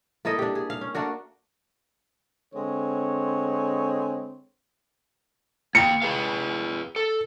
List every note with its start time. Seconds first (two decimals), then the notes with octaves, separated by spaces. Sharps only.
0.25 A#3 E4 A4 D#5
0.39 D4 G4
0.55 G#4
0.70 F5
0.81 C#4
0.95 A3 A#3 D4 F#4
2.54 D3 G#3 C4 C#5
5.75 A#3 G5 C#7
6.02 G#4 B4 F5
6.96 A4